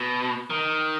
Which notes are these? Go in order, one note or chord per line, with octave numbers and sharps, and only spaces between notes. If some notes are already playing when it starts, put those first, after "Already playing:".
Already playing: B2
D#3